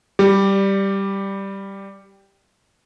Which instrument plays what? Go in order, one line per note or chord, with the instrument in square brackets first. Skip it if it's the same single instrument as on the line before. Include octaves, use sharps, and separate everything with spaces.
[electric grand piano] G3 G4